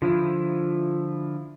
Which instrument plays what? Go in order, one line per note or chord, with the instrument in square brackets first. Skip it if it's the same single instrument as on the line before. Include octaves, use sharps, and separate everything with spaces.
[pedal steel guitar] D3 F3 E4 [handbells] F4